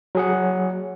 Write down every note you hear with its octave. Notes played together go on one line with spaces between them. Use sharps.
F#3 G#4 F#5